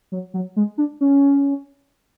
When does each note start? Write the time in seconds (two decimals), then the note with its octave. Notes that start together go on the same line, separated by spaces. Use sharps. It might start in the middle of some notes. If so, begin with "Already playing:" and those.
0.12 F#3
0.34 F#3
0.56 G#3
0.78 D4
1.01 C#4